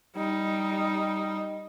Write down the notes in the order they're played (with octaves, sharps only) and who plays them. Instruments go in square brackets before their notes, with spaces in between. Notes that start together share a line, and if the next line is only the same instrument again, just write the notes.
[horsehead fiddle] G3 D#4